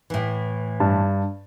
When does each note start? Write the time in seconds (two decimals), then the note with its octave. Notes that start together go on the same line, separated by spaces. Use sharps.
0.10 A2 E3
0.80 G2 A5